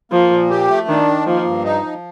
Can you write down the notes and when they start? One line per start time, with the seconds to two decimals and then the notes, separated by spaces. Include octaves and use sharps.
0.12 F3 A#3
0.31 A#2
0.50 G4
0.69 A3
0.88 D#3 D4
1.07 D#3
1.27 F3 A#3
1.46 G2
1.64 D#4
1.83 F3